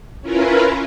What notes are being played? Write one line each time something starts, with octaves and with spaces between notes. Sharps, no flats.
C#4 E4 F4 A#4 B4